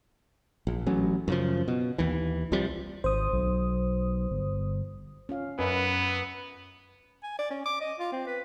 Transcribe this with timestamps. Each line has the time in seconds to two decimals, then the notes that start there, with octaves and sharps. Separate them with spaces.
0.67 A#1
0.86 A1 F#3 C#4
1.28 F#2 C#3 F3
1.68 B2
1.98 D#2 E3
2.52 C2 C3 F3 G3
3.04 G#1 C5 D#6
3.33 B1
4.31 G1
5.29 C#4 F4 F5
5.59 F#2 B3 B4 D#5
7.23 G#5
7.39 D5
7.51 C#4
7.66 D6
7.81 D#5
7.99 F4
8.12 C4
8.27 B4